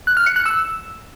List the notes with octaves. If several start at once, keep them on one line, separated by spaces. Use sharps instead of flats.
F#6
F6
C#7
F#6
E6